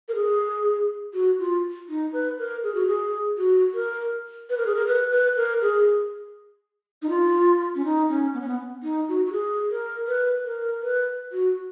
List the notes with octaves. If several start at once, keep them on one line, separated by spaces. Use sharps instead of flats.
A#4
G#4
F#4
F4
D#4
B4
A#4
G#4
F#4
G#4
F#4
A#4
B4
A#4
G#4
A#4
B4
B4
A#4
G#4
D#4
F4
C#4
D#4
C#4
B3
C#4
B3
D#4
F#4
F#4
G#4
A#4
B4
A#4
B4
F#4